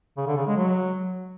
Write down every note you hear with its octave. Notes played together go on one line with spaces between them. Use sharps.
C#3
D3
C#3
G#3
F#3